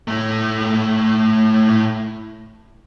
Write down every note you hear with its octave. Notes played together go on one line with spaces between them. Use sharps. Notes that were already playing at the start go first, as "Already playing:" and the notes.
A2 A3